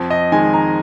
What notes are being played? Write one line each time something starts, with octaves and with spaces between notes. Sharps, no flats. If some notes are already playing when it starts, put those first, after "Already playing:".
Already playing: F2
D#5
D#3 G#3 G#5
A#5